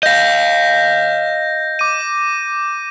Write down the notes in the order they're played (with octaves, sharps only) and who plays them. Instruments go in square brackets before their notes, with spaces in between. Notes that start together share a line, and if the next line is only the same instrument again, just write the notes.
[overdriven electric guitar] D#5 F5 [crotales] G6 A#6
[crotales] D6 D#7